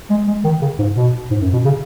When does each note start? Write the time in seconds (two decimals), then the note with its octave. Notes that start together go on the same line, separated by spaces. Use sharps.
0.10 G#3
0.28 G#3
0.44 D#3
0.62 C#3
0.79 G#2
0.96 B2
1.31 G#2
1.42 F#2
1.53 B2
1.65 C#3